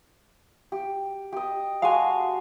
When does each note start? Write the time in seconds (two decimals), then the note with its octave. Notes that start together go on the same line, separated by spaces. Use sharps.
0.72 G4
1.33 G4 D#5
1.82 G#3 F#4 F5 G#5 A5